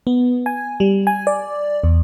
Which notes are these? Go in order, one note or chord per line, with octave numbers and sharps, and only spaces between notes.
B3
G#5
G3
G#5
D5
E2